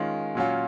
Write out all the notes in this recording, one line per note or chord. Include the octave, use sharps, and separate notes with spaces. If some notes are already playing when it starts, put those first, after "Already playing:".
Already playing: D#3 G#3 C#4 F4
A#2 F#3 C#4 F4